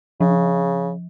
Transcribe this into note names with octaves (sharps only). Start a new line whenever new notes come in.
C#3 F3